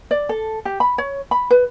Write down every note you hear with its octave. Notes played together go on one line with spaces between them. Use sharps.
D5
A4
G4
B5
C#5
B5
B4